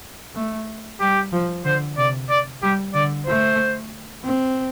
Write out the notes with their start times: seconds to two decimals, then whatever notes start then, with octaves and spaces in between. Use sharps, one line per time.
0.35 A3
1.00 G3 G4
1.33 F3
1.65 D3 C5
1.97 C3 D5
2.29 D5
2.62 G3 G4
2.94 D3 D5
3.26 A3 C5
4.24 C4